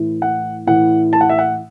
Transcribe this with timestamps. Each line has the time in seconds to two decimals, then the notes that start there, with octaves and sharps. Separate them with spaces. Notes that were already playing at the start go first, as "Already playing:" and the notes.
Already playing: A2 E3
0.22 F#5
0.67 A2 E3 F#5
1.13 A5
1.21 F#5
1.29 E5
1.38 F#5